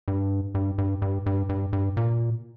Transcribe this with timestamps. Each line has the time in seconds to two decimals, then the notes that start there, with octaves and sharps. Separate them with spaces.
0.08 G2
0.55 G2
0.78 G2
1.02 G2
1.26 G2
1.49 G2
1.73 G2
1.97 A#2